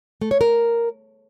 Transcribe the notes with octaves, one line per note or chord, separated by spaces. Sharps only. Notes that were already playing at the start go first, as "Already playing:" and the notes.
A3
C#5
A#4